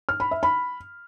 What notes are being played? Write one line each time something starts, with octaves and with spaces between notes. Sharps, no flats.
F6
B5
E5
B5